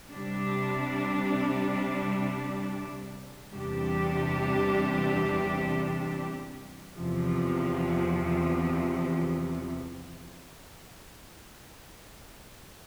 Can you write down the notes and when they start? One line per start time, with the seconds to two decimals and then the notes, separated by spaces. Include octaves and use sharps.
0.10 C3 G3 D4
3.52 E2 C3 G3 D4 G4
6.95 E2 C3 F3